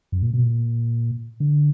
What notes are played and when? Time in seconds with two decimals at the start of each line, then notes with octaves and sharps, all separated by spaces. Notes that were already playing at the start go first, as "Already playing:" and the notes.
0.12 F#2
0.22 A#2
0.33 B2
0.43 A#2
1.40 D3